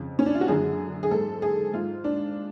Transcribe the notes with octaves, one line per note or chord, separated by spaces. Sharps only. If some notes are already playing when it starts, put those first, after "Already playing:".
Already playing: F2 C#3
C#4
D4
F4
F#4
F#2 D3 G#4
G#4
G#2 A4
G#4
G#2 F4
D4